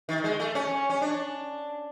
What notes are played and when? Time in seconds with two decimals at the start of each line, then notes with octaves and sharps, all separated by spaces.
0.09 D#3
0.24 G#3
0.40 A3
0.55 C#4
0.90 C#4
1.02 D4